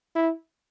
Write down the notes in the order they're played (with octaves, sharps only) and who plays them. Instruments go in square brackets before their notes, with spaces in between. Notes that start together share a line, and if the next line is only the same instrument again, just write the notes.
[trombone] E4